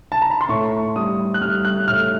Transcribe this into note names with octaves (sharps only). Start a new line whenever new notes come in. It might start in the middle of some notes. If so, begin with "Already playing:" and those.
A5
A#5
B5
C6
A2 C#6
G3 D#6
F#6
G3 F6
F#6
A2 F6